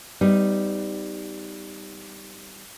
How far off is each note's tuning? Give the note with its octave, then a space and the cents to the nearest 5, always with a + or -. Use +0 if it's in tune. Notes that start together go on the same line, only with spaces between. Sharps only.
G3 +0 B3 +45 D#4 +0